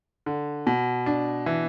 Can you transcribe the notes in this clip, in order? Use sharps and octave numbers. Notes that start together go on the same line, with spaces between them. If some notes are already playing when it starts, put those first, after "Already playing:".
D3
B2
D4
E3